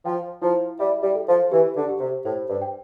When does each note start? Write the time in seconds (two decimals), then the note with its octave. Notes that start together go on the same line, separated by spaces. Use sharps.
0.05 F3 G5
0.42 F3 E4
0.79 G3 E5
1.02 G3
1.15 A4
1.28 F3
1.51 E3 G4
1.76 D3
1.89 G4
2.00 C3
2.24 A2 C5
2.49 G2
2.62 G5